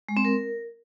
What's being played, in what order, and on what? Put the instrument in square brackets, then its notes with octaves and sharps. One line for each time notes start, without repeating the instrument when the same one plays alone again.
[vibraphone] G#3
C4
A#4